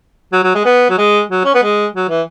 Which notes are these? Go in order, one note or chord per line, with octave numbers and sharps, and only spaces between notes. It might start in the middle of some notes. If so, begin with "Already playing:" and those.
F#3
F#3
G#3
B3
F#3
G#3
F#3
C#4
B3
G#3
F#3
E3